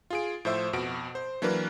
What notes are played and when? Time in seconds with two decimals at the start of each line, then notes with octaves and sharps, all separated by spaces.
0.10 F4 G#4 D7
0.45 A2 F3 C5 E5 E6
0.73 F2 B2 F#4 D7
1.15 C5
1.42 E3 F#3 A#3 D4 A#4 B4